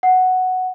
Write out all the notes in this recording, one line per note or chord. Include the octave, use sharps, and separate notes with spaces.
F#5